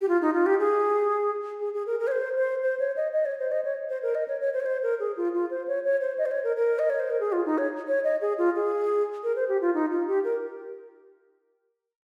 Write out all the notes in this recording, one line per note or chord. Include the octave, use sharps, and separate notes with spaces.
G4
F4
D#4
F4
G4
G#4
G#4
G#4
A#4
A#4
C#5
C5
C5
C5
C#5
D#5
D#5
C#5
C5
D#5
C#5
C5
A#4
D#5
C#5
C#5
C5
C#5
C5
A#4
G#4
F4
F4
C5
C#5
C#5
C5
D#5
C5
C#5
A#4
A#4
D#5
C#5
C5
A#4
G#4
F4
D#4
C#5
C#5
D#5
G#4
F4
G#4
A#4
C5
G4
F4
D#4
F4
G4
A#4